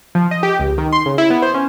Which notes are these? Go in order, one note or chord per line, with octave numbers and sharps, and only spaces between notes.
F3
D#5
G4
C#2
D#3
C6
C#3
E4
B3
C5
C#4